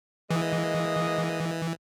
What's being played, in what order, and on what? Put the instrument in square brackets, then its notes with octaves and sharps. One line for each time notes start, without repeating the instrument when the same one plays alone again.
[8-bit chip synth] E3 [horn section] G#3 A#3 D#5